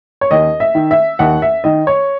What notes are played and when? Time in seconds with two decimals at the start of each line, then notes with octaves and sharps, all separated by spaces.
0.21 C#5
0.31 D#2 D#5
0.60 E5
0.75 D#3
0.91 E5
1.19 D#2 F#5
1.42 E5
1.64 D#3 D#5
1.87 C#5